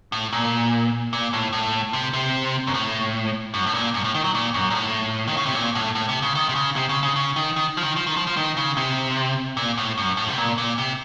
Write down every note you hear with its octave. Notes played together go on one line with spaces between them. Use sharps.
A2
A#2
A#2
A2
A2
C3
C3
F#2
A2
F#2
A2
A#2
F#2
A2
D#3
F#3
A#2
F#2
A#2
A2
D#3
C#3
C3
A#2
A2
A2
C3
C#3
D#3
C3
C#3
C3
C#3
C#3
C#3
D#3
D#3
F3
D#3
F3
D#3
F3
F3
D#3
C#3
C3
A#2
A2
F#2
A2
C3
A#2
A#2
C3